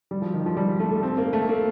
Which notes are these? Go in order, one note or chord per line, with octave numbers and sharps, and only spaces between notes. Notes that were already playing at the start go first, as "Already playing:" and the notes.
G3
F3
D#3
F3
G3
A3
A3
C4
A#3
A3
A#3